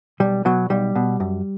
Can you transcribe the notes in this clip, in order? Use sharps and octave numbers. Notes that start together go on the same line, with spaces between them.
B1 G3
B2 F#3
B1 G3
B2
F#2